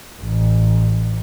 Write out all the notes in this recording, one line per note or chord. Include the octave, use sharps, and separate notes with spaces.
A1